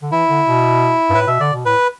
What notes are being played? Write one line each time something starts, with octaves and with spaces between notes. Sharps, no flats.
D3
E3 E4
D3
B2
G2
A2 B4
B2 E5
D3 D5
B2
A2 B4